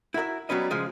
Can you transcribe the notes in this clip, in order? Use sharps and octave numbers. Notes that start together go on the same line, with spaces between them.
E4 F#4 A#4 E5
F#3 G3 B3 C#4 B4 D#5
C#3 F3 G#3